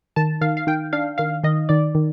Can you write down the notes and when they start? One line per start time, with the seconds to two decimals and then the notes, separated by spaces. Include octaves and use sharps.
0.16 D#3 A5
0.41 D#3 F5
0.57 F5
0.67 D#3 G5
0.93 D4 F5
1.18 D#3 F5
1.43 D#3 D#5
1.69 D#3 D5
1.95 D#3